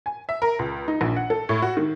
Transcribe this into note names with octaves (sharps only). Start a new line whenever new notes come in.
G#5
E5
A#4
C#2
D#4
A#1
F#5
A4
A2
F#4
D#3